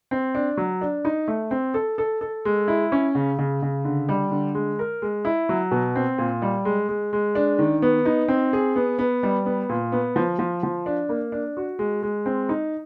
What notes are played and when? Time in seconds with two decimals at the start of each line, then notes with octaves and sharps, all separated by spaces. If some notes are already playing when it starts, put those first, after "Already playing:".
0.11 C4
0.35 D4
0.57 F#3
0.81 D4
1.05 D#4
1.28 A3
1.51 C4
1.74 A4
1.98 A4
2.21 A4
2.45 G#3
2.68 E4
2.92 C#4
3.15 C#3
3.39 C#3
3.62 C#3
3.85 D3
4.09 G3
4.31 D3
4.55 G#3
4.79 A#4
5.02 G#3
5.25 E4
5.49 F#3
5.71 B2
5.96 C4
6.18 A#2
6.42 G3
6.65 G#3
6.89 G#3
7.13 G#3
7.35 D4
7.59 D#3
7.82 B3
8.05 D#4
8.28 C4
8.53 G#4
8.76 B3
8.99 B3
9.23 G3
9.46 B3
9.69 A#2
9.92 B3
10.16 F3
10.39 F3
10.63 F3
10.86 D4
11.09 A#3
11.32 D4
11.57 F#4
11.79 G#3
12.03 G#3
12.26 C4
12.49 D#4